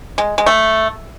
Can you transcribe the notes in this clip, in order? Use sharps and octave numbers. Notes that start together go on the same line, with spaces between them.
G#3
G#3
A3